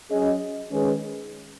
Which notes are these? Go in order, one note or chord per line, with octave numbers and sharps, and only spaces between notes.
F#3 C#4 G#4 D#5
D#3 G#3 C#4 G#4 B4